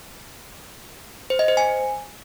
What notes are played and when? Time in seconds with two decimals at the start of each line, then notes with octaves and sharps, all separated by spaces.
1.30 C5
1.39 D#5
1.48 C5
1.57 G#5